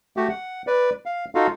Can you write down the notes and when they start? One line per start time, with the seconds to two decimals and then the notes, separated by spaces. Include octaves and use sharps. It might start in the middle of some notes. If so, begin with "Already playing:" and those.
0.17 A3 F#4 G4
0.29 F#5
0.67 B4 D5
1.06 F5
1.35 D#4 F4 F#4 A4 F5